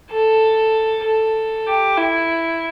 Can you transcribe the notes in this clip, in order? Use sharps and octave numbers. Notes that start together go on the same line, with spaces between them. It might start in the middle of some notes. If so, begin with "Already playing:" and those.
A4
A4
G4
E4